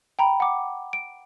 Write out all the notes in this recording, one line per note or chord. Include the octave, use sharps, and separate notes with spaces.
G5 A#5 B5
F#5 D6
D7